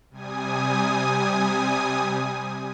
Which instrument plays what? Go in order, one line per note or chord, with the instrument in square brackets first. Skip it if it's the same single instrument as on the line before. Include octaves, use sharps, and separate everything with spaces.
[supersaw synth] C3 G3 G#5 D#6